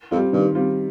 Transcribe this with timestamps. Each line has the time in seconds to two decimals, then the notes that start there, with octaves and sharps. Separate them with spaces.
0.11 F2 F4
0.14 G3 C4
0.33 G2 D#3
0.55 G3 C4 F4